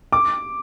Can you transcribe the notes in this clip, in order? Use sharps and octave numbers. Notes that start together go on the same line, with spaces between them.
D6